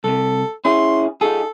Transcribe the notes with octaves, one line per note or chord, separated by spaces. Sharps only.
C2 C3 A4
C#4 E4 G#4 C6
D#4 F4 G#4 A4